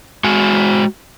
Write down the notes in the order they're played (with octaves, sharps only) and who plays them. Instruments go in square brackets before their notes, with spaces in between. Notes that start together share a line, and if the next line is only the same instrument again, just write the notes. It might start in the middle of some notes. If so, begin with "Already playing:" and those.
[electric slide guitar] G#3 F#4 G#5